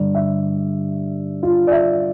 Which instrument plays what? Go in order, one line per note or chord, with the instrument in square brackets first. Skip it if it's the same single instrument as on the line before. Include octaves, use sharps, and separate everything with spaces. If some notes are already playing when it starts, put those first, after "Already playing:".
Already playing: [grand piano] G2 D3 D5
E5
F4
D5
E5